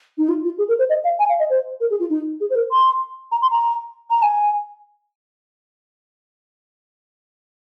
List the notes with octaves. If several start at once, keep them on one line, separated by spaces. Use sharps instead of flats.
D#4
F4
F4
G#4
A#4
C5
D#5
F5
G#5
F5
D#5
C5
A#4
G#4
F4
D#4
G#4
C5
A#4
C6
A#5
C6
A#5
A#5
G#5